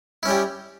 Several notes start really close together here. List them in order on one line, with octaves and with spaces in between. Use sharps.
E4 C#4 G4 G3